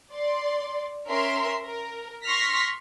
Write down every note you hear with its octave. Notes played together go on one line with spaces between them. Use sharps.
D5 C6
C#4 A#4 E5 C6
A#4
C6 C#6 F6 A#6 B6